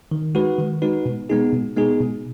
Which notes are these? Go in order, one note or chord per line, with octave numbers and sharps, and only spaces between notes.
D#3
G#3 D#4 F#4 B4
D#3
G#3 D#4 F#4 B4
B2
G#3 B3 D#4 G#4
B2
G#3 B3 D#4 G#4
B2